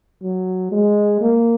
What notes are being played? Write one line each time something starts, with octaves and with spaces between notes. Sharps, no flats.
F#3
G#3
A#3